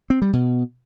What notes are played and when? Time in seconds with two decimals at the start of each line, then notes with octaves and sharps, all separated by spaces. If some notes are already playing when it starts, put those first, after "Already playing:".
0.10 C4
0.22 G3
0.33 B2